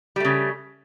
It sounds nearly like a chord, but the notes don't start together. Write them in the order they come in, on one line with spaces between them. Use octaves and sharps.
G3 A3 C#3